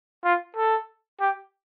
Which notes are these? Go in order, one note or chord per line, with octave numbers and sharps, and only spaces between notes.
F4
A4
G4